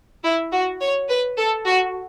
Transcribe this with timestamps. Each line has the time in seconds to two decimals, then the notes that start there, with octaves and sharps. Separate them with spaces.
0.24 E4
0.52 F#4
0.80 C#5
1.09 B4
1.37 A4
1.66 F#4